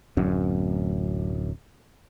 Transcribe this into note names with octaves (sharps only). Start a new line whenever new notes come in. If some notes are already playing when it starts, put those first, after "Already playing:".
D1 F#2